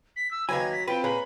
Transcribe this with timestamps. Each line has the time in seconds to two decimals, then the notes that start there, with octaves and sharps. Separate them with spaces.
0.16 B6
0.31 E6
0.49 D#2 F#3 B4 G#5 B5 G#6
0.72 B6
0.88 C4 F4 B4 G5
1.04 A#2 G#4 B4 C#5 A#5 B5